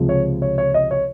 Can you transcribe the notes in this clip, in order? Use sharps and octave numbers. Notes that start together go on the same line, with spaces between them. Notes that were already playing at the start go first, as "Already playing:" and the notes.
Already playing: C#2 C3 F3 G#3
C#5
C#5
C#5
D#5
C#5